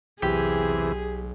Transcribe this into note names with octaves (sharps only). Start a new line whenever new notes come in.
B1 E2 C3 E3 G4 G#4